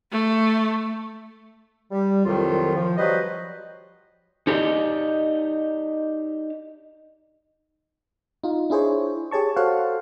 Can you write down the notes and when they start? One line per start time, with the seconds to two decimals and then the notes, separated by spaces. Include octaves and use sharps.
0.11 A3
1.91 G3
2.25 C2 F2 D#3 F#3 F4
2.76 F3
2.98 F#3 G3 B4 C5 D#5
4.47 D#4 G4 A#4 C5 D5 D#5
8.44 D#4 F4
8.70 D4 E4 G#4 C5 C#5
9.31 G4 G#4 C#5 A5 C#6
9.56 F#4 A4 C5 C#5 F5 F#5